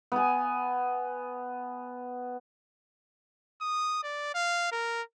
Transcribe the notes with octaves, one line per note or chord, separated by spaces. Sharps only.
B3 G#5
D#6
D5
F5
A#4